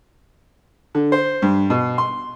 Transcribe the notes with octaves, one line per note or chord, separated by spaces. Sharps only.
D3
C5
G2
B2
C6